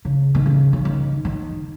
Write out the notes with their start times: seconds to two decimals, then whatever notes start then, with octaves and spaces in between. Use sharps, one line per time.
0.05 C#3
0.35 D#3
0.46 C#3
0.73 C#3
0.85 D#3
1.25 D#3